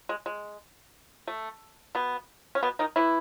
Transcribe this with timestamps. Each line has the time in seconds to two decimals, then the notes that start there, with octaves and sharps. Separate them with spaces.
0.09 G#3
0.26 G#3
1.27 A3
1.95 B2 B3
2.55 C#4
2.63 B2 B3
2.79 D#3 D#4
2.96 E3 E4